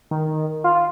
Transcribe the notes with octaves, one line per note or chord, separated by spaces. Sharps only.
D#3
F4